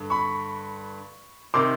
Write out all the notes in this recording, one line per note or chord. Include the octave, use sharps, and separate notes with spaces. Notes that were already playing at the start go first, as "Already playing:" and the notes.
Already playing: G2 D3
B5 C#6
C3 D#3 C6 D6